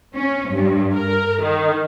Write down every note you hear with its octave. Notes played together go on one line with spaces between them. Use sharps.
C#4
G2
A#4
D#3